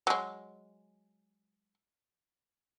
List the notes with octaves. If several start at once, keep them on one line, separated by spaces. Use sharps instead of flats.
F#3 G#3